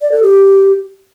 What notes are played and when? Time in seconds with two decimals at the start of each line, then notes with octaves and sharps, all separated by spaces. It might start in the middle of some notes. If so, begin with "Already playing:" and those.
0.01 D5
0.12 A4
0.22 G4